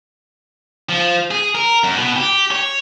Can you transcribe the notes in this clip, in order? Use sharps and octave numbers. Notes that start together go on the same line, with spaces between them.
F3
G#4
A#4
F#2
B2
G4
C#5